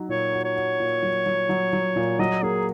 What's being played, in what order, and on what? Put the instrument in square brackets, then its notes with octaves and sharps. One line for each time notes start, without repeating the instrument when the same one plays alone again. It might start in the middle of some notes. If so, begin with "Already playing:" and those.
Already playing: [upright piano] F#3 D#4 F#4
[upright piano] A#2 [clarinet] C#5
[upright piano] F#4
[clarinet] C#5
[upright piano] F#4
A#2
F#3
F#3
F#3
F#3
A#2
[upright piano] F#3 [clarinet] D#5
[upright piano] A#3 [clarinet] G#4